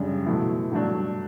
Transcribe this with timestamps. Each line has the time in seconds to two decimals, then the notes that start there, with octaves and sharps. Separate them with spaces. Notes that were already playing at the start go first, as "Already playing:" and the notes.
Already playing: F#2 C#3 G3 D4
0.26 B2 F#3 A3 E4
0.71 G2 F#3 A3 D4